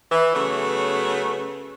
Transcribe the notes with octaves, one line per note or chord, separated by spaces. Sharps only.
E3
C#3 F#3 A3 B3